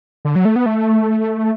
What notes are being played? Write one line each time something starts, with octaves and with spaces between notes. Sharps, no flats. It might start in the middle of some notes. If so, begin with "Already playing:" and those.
D3
F#3
A3
B3
A3